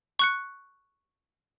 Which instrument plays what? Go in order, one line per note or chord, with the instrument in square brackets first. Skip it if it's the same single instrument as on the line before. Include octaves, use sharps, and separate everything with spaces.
[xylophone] C#6 F#6 C#7